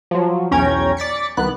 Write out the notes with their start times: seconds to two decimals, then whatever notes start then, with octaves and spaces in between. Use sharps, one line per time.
0.11 F3 F#3
0.51 B1 E2 C#4 G5 A#5 G#6
0.97 D5 A6 B6 C#7
1.37 C2 D#3 B3 F#6